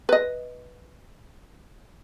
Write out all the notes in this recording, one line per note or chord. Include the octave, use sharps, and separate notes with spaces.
B4 D#5